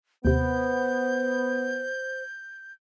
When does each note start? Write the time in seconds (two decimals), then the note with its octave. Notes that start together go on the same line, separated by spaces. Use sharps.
0.25 D#2 C3 B3 C5 G6